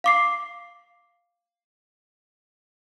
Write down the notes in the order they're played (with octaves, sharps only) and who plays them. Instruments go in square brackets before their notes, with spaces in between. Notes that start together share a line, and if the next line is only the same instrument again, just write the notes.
[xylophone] F5 D6 C7